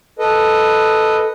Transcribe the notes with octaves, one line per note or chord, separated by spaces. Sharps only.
A4 B4 D#5